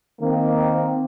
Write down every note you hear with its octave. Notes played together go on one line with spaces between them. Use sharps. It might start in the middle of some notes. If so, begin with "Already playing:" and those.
D#3 A#3 C4